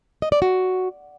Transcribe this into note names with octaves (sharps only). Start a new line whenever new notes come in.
D#5
D5
F#4